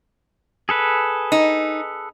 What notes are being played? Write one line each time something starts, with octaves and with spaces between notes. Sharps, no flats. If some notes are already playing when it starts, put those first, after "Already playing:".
G#4 A4 B4
D#4